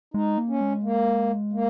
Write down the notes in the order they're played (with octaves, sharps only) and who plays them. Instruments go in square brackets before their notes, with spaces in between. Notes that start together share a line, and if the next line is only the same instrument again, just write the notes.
[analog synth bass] G#3 [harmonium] D#4
[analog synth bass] A#3
[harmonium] C#4
[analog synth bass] G#3
[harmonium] A#3
A#3